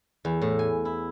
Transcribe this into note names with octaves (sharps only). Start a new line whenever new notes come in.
E2
A2
G#5
E4